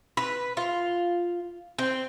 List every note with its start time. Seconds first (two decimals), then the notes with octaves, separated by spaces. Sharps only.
0.17 B4
0.57 F4
1.79 C4